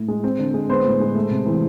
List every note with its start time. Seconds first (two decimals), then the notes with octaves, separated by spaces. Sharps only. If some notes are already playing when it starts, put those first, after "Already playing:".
Already playing: A2
0.08 G#3
0.24 C4
0.39 D3
0.54 G#3
0.69 B3 C5
0.84 A2
1.00 G#3
1.15 A3
1.31 C3
1.46 E3